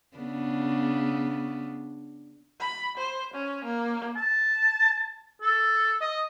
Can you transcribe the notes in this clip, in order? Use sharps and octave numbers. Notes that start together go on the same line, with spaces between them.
C#3 B3 D4
B5
C5
C#4
A#3
A5
A4
D#5